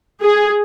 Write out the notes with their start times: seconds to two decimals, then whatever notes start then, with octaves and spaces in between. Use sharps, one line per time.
0.23 G#4